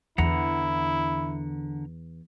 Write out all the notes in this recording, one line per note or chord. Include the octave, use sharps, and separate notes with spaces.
E2 D3 E4 F#5 A#5